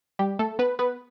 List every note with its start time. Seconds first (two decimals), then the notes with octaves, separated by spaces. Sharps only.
0.19 G3 G4
0.39 A3 A4
0.59 B3 B4
0.79 B3 B4